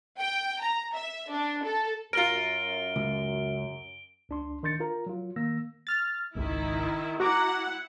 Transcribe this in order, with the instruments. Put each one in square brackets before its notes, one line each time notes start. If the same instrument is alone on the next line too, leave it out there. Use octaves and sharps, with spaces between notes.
[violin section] G5
A#5
E5
D4
A4
[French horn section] F#2 [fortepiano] F4 A#4 [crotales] D7 G7
[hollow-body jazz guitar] C#2
[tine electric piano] C#2 D4 C6
D#3 D4 C6 G6 A6 C#7
F4 A#4 A#5
F#3 F4
D#3 A#3 E6 A#6
[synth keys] F6 A6
[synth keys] G#1 C#2 [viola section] D#3 E4
[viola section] E4 F#5 [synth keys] F#4 A#5 D6